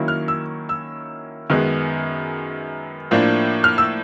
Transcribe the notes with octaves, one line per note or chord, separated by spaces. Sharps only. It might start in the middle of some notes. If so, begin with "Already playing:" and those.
Already playing: D#3 F#3 A#3 C#4 E4
F6
E6
E6
F#2 D#3 G#3 B3
A2 F3 A#3 D4
F6
E6